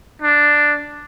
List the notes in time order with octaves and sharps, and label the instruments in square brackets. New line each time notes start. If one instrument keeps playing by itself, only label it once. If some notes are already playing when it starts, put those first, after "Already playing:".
[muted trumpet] D4